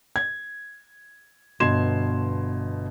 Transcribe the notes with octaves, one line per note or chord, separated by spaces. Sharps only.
G#6
G1 B2 C6 G#6 E7